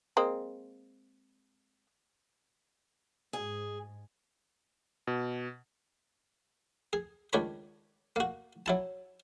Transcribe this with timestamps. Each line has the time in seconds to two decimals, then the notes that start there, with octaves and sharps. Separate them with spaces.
0.17 G#3 A#3 C4
3.33 G#2 G#4
5.07 B2
6.93 G#4
7.33 C#2 D#3 D4 C#5 B5
8.16 A#3 F#4
8.66 F#3 E4 A5